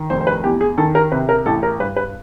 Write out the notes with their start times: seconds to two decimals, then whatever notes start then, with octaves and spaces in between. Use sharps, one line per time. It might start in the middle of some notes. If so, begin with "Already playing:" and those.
Already playing: D#3
0.10 F1 C5
0.21 C5
0.27 B4
0.44 E2 G4
0.61 G#4
0.78 D#3 A4
0.95 A#4
1.12 C3 B4
1.29 A#4
1.46 A1 A4
1.63 A#4
1.79 G2 B4
1.97 B4